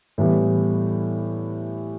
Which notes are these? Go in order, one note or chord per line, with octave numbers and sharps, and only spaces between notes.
A2 E3 G3 B3 E4